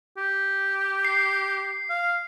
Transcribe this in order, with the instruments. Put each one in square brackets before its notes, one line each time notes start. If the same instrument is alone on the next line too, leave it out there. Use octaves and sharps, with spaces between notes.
[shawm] G4
[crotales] C7
[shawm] F5